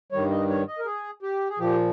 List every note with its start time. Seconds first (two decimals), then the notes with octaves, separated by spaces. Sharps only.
0.12 G2 D#3 G3 C#5
0.31 D#5
0.49 C#5
0.68 D#5
0.79 A#4
0.85 G#4
1.23 G4
1.50 G#4
1.59 A#2 F3 G4